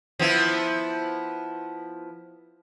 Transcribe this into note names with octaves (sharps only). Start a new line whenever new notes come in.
F3 B3 E4